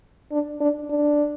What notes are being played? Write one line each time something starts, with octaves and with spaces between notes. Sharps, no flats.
D4
D4
D4